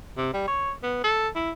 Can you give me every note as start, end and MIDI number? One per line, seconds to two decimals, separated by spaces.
0.17 0.33 48
0.34 0.46 55
0.48 0.72 73
0.83 1.03 59
1.04 1.28 69
1.36 1.51 64